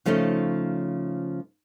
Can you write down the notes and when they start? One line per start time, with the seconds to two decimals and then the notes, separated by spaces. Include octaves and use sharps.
0.05 C#3 F3 A3 C#4 D#4